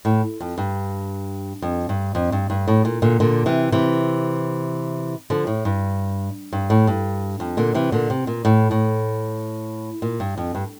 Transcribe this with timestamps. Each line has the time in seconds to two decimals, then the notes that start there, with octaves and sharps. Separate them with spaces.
0.05 A2
0.40 F2
0.58 G2
1.62 F2
1.89 G2
2.15 F2
2.32 G2
2.50 G2
2.68 A2
2.85 A#2
3.02 A#2 D3
3.20 A#2 D3
3.46 C3 E3
3.72 C3 E3
5.30 D3 F3
5.47 A2
5.65 G2
6.52 G2
6.70 A2
6.87 G2
7.40 F2
7.57 A#2 D3
7.75 C3 E3
7.92 A#2 D3
8.10 C3
8.27 A#2
8.45 A2
8.71 A2
10.02 A#2
10.20 G2
10.37 F2
10.55 G2